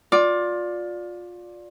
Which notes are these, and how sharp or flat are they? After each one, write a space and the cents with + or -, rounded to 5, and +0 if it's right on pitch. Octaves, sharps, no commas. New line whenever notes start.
F4 +25 D5 +0